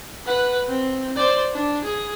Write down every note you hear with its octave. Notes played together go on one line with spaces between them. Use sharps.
B4 F#5
C4
C5 D5
D4
G#4